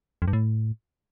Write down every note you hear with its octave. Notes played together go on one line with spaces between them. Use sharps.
F2
G2
A2